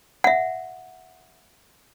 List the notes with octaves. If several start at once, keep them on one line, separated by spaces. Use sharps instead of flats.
E5 F#5